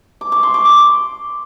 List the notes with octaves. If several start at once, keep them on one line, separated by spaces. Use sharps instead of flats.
D6
C#6
C6
D6
D6